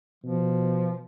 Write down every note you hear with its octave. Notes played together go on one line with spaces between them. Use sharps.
B2 F3